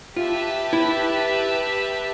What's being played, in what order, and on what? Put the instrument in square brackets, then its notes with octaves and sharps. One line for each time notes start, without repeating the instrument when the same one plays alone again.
[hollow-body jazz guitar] F4 [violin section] G4 B4 E5 A5
[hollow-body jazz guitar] E4